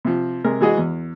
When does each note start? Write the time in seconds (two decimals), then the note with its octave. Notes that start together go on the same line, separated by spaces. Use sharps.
0.05 C3 F3
0.44 C3 G#3 A#4
0.61 E3 G#3 F#4 G#4 D#5
0.77 E2